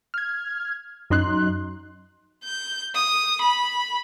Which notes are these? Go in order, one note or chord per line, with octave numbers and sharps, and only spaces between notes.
F6 G#6
F#2 D#4 C6 F#6
G6
D#6
B5